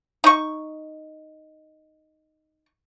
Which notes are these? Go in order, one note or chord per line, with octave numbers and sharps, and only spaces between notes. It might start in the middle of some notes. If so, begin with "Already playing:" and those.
D#4 C#6